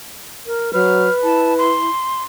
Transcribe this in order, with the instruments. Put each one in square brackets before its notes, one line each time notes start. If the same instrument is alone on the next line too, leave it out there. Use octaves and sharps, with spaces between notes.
[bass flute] A#4
[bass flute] F#3 [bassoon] B4 [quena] F6
[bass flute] E4 [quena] A5
[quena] C6